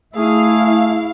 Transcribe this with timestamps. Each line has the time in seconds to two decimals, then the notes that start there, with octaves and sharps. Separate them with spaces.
0.16 A3 E4 G#4 F5